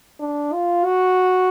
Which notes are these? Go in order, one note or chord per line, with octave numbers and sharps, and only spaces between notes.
D4
F4
F#4